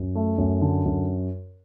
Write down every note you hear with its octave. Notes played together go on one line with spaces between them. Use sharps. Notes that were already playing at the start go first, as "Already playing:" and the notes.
Already playing: F#2
A3
F#2
D3
F#2